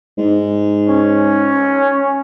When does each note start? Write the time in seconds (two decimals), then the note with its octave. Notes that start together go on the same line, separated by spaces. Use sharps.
0.18 G#2
0.88 C#4